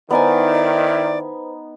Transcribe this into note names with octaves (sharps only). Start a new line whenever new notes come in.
D#3 B3 D#4 E4 B4 C5 D5 G#5